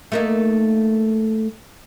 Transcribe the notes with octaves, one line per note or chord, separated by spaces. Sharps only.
A3 A#3 D#4